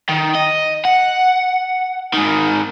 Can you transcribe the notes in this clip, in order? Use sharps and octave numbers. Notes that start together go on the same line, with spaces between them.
D#3
D#5
F#5
G#2 D#3